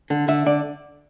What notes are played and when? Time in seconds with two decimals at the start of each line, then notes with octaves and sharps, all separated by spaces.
0.10 D3
0.28 D3 E5
0.46 D3 D5